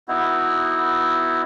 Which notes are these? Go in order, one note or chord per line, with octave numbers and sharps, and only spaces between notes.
B3 D#4 E4 F#4